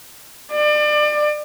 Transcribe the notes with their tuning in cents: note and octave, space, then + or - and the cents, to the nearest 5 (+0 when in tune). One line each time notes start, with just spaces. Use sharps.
D5 +30